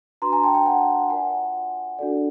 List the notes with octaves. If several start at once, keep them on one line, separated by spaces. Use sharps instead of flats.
D4 F#4 B4 A#5 C6
G#5 A#5
G5 A5
G5 A5
F#5 G#5
F4 A#4 D5 F#5 G#5
D4 F#4 A4 D5